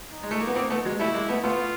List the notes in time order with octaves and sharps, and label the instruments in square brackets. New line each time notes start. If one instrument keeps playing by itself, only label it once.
[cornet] D#4
[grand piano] G#3
A3
A#3
B3
A#3 C4
A3 B3
F#3 G#3
[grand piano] G3 A3 [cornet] E4
[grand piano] G#3 A#3
A3 B3
[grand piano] A3 B3 [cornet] F4